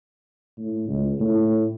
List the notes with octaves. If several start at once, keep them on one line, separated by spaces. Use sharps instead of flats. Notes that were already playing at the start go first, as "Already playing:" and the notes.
A2
C#2
A2